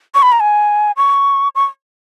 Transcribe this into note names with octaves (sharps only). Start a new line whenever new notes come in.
C#6
B5
A#5
G#5
C#6
C#6